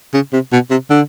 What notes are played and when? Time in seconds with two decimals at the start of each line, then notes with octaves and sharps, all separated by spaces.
0.14 C#3
0.33 C3
0.52 B2
0.70 C3
0.90 D3